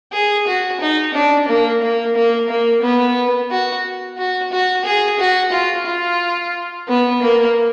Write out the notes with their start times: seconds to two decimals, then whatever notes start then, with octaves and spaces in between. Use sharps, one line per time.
0.12 G#4
0.46 F#4
0.80 D#4
1.13 D4
1.48 A#3
1.82 A#3
2.15 A#3
2.49 A#3
2.82 B3
3.50 F#4
4.18 F#4
4.52 F#4
4.84 G#4
5.19 F#4
5.52 F4
5.86 F4
6.88 B3
7.22 A#3